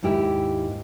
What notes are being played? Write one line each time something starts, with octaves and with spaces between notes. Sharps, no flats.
D#2 G#2 E4 G4 A#4 G5